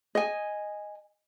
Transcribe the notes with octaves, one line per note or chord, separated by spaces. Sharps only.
D#5 G#5